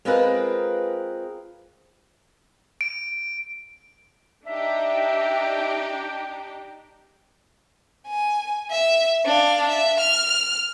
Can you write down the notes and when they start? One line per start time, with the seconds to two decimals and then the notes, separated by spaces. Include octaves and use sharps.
0.05 G#3 C4 F4 G#4 A#4 B4
2.81 D7
4.47 D4 D#4 G4 E5
8.08 G#5
8.70 E5
9.25 D4 F5
9.69 E5
10.00 F6